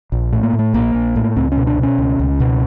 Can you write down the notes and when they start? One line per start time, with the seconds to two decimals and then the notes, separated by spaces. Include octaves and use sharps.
0.12 A#1
0.33 A2
0.43 A#3
0.53 A2
0.59 A3
0.74 A#1 A#3
0.95 A#1
1.16 A2
1.36 C#2 C4
1.52 C#4
1.57 B2
1.67 D4
1.78 B2 C#4
1.98 C#2
2.19 C#2
2.40 B2